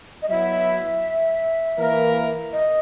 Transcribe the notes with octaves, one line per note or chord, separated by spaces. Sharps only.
D#5
F#3 B3 E4 E5
E3 A#3 E4 A#4
D#5